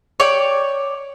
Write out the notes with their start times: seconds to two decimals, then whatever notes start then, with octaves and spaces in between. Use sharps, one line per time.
0.20 C#5 D5 G5